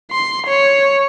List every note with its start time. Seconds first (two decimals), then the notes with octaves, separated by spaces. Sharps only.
0.11 C6
0.47 C#5